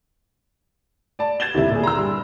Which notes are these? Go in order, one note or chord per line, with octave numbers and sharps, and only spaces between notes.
D5 A5
G#6 A6 E7 G7
G1 D#2 A2 C3 E3 E4
A#2 G#4
A#5 C6 E6
G2